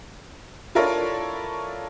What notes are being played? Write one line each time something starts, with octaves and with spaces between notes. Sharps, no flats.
D4 E4 F4 A4 A#4 C#5